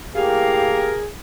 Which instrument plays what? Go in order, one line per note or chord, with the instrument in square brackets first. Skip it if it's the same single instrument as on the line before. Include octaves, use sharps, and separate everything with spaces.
[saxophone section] A2 A#3 F5 [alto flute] G4 [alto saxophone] G#4 [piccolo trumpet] A#4